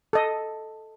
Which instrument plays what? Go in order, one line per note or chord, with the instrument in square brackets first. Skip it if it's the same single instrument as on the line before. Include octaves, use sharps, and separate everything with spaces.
[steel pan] A4 D#5